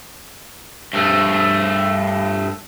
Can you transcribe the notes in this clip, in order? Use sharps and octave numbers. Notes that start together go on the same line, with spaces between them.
G2 A3